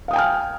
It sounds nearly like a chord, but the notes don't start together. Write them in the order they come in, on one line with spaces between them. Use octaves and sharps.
F5 D#6 G5 G#5 F6